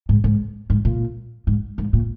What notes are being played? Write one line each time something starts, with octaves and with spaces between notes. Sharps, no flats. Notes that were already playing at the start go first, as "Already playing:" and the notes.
G#2
G#2
G#2
A#2
G#2
G#2
A#2